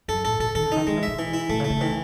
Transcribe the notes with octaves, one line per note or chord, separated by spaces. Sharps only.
F#2 A4
A2 A4
B2 A4
D#3 A4
C#3
D#3 D#4
D#3 G#3
E3
B2 E5
E3
E4
B2 A3
C#3
A3
C#3
D#3 E3